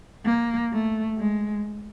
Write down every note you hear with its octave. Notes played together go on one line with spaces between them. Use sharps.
A#3
A3
G#3